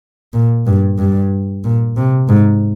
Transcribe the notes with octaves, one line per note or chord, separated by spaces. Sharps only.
A#2
G2
G2
A#2
C3
G#2